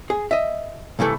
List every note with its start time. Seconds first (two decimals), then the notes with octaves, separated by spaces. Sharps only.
0.10 G#4
0.31 D#5 E5
0.99 C2 G2 E3 A3 A4